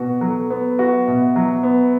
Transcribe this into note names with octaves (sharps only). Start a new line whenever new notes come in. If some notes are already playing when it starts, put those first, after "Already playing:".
Already playing: B2 F#4 B4
F#3 A4
B3
F#4 B4
E5
B2 F#5
E5
F#3 B4
B3